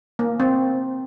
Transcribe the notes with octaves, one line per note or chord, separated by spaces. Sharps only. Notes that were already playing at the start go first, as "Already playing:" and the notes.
A#3
C4